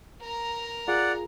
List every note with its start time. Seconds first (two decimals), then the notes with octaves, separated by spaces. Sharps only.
0.22 A#4 A#5
0.88 F4 G#4 D5 F#5